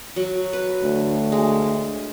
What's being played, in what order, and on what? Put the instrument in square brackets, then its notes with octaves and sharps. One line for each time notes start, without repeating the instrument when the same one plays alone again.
[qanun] F#3
B4
[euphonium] D2
[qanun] G#3